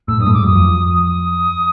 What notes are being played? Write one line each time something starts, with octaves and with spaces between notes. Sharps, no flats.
A2 E6
G2 D#6
A2
G#2 D6
F#2 D#6
F2
D#6